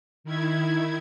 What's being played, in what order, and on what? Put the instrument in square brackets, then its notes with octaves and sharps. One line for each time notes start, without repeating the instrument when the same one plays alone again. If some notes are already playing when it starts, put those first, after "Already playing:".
[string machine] D#3 E4 G#6